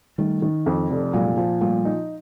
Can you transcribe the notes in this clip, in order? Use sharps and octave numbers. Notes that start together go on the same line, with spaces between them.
D#3 G3 A3
D#3
F2
F1
A#2 F#3 G#3
F3
A#2 G3 A3
D#4